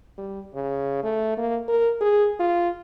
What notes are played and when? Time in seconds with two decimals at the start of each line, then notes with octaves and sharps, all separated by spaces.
0.18 G3
0.54 C#3
1.03 A3
1.37 A#3
1.68 A#4
2.01 G#4
2.40 F4